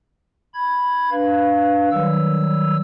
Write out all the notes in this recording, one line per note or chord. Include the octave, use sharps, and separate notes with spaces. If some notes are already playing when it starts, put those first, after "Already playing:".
B5 G#6
D4 B4 F5
D#3 F#3 G3 E6